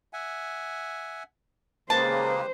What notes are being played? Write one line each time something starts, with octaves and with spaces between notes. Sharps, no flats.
E5 F#5 G#5
C#3 G#3 A#3 G4 B4 C5 A5